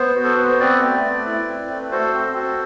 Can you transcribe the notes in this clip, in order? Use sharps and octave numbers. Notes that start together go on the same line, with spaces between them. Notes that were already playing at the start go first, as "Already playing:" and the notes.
Already playing: B3 C5
F#4
A4
B3 B4
C5
C4 B4 D5
A3
A3
E4
C4
A3
F#4 A4 C5
C4
F#4